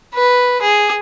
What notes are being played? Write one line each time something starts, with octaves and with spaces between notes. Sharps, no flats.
B4
G#4